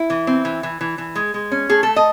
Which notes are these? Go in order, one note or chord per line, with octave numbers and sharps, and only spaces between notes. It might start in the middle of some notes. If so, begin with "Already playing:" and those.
Already playing: E4
E3
C4
E3
E3
E3
E3
G#3
G#3
C#4
A3 G#4
A3 A4
D#5